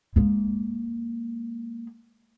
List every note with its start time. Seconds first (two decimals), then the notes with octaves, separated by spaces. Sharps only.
0.16 G#3 A#3